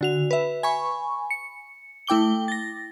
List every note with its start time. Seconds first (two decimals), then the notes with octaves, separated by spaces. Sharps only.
0.01 D3 F#4 F7
0.31 B4 E5
0.63 G#5 B5 C#6
1.30 C#7
2.07 A3 E4 G5 D6 G7
2.48 A6 A#6